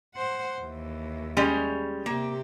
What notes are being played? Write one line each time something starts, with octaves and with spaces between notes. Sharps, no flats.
C5 F#5
D#2 E3
G3 G#3 C#4
C3 A#3 G4